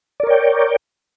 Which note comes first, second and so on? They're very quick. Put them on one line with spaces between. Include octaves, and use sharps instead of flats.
D5 A#4 C#5 G5